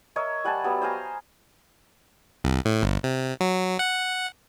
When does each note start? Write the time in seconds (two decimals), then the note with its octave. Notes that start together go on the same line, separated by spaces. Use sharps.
0.16 A#4 C#5 D#5 E5
0.44 G3 F#5 G#5 A5
0.64 F#3 G3 B3
0.82 C5 F5 G#5 A#5
2.44 C2
2.65 A2
2.83 G1
3.04 C3
3.41 F#3
3.79 F#5